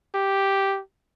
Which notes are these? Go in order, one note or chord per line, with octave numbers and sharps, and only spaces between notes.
G4